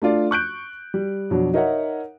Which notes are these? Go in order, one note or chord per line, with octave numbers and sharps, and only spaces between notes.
A3 D4 F4 D5
C#6 F#6 G6 D7
G3
F2 B2 F#3 D4
D#4 A#4 C#5 E5 F#5